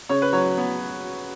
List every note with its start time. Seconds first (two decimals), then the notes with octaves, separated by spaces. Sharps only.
0.09 C#3 C#5
0.22 B4
0.33 F#3 C#5
0.57 B3